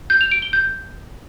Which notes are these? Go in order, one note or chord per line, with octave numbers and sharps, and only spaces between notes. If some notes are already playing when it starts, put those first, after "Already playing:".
G6
F7
D7
G7
G6